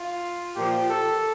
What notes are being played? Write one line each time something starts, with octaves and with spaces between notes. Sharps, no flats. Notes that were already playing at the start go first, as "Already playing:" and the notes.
Already playing: F4
A#2 F3 G4
A4